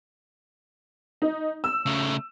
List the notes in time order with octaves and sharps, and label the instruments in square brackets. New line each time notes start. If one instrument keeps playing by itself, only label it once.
[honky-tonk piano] D#4
E6
[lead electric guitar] C#3 A3